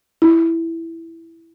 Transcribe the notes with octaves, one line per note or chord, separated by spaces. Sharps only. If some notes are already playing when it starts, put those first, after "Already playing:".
E4